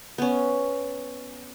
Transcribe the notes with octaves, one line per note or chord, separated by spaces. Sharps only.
B3 C#4